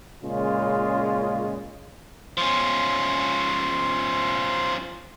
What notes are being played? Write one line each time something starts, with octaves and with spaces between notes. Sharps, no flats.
A#2 C#3 G#3 C#4 F4
F3 C#4 C6